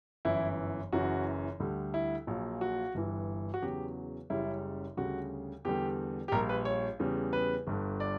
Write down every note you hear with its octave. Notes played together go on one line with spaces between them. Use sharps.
G1 F#2 E3 E4
F#1 F#2 E3 F#4
D2 D3 G3
E4
A#1 A#2 F#3
F#4
G1 G2 E3
F#4
E2 C#3 F#3 G4
F#1 F#2 C#3 G3 E4
D2 C#3 G3 F#4
E2 D3 G3 G4
G4
A#1 A#2 G3 A#4
B4
C#5
E2 C#3 G3
B4
G1 G2 D3
D5